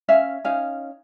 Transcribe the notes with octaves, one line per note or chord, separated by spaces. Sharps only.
C#4 E5 F5
C#4 D#4 F5